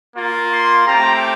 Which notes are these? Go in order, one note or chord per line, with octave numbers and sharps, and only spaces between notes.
A#3 F4
C6
A3 C4 G4 A#5